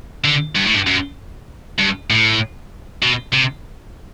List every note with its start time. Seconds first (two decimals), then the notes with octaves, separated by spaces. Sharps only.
0.25 D3
0.56 G2
0.65 A2
0.74 G2
0.87 F#2
1.79 G2
2.10 A2
3.02 B2
3.33 C3